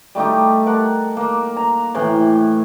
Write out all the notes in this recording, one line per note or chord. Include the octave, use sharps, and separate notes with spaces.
G3 A3 D#4 G4
A#4 F#5 A5
A#3
A#5
A2 C3 E3